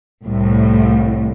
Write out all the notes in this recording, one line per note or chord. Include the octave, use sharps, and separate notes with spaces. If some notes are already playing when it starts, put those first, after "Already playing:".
C2 A2